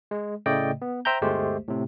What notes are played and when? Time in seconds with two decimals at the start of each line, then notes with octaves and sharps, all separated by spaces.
0.11 G#3
0.46 A2 C#3 A3 D5 D#5 G5
0.82 B3
1.05 C5 E5 G5 A#5 G6
1.22 G1 D2 G#3 A3 G4 C5
1.68 A2 C3